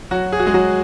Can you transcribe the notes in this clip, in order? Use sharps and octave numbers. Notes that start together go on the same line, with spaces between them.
F#3 F#4
G#4
F#4
G#3 G#4
F#3 F#4